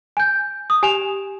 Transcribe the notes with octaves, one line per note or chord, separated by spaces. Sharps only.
G#5 G6
D#6
G4 G#5 E7 F7